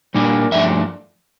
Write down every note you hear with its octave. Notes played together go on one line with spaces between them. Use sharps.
A#2 G3 A#3 D4
G2 F3 A3 D4 E5